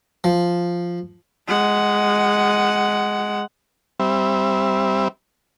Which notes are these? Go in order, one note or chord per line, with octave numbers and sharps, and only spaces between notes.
F3
G#3 F#5
G3 C4 E5